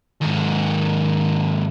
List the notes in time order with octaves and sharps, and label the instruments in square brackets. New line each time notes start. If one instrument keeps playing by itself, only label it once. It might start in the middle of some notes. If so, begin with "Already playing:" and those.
[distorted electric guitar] D#2 G#2